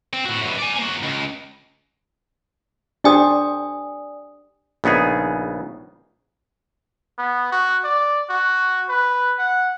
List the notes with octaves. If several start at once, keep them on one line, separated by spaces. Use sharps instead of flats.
C4
A2 F#4
F#2 B2
D5 G#5
A#3 F#4
C#2
D4 G4 C5 D5 G#5 D#6
A#1 C#3 B3 D#4 G#4
B3
F#4
D5
F#4
B4
F#5